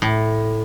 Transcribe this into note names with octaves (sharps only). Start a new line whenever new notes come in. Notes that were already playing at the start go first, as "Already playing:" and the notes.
A2